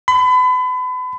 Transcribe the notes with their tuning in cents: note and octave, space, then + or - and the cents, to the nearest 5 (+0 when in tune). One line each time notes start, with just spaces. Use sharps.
B5 +35